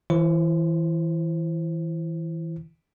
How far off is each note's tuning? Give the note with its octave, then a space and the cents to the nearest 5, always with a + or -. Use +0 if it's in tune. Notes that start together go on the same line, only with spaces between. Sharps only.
E3 -25 E4 +35 C5 +20